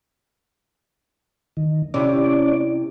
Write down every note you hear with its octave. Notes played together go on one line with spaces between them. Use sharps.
D#3
C3 C#4 E4 G4 D5